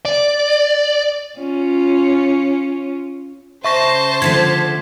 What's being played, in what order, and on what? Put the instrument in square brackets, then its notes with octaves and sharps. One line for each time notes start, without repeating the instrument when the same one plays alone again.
[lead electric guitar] D5
[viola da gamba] C#4 F4
[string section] C#3 C5 [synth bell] E5 C#6 A#6 [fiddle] A5
[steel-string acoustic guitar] D3 F3 A3 [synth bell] G#6 B6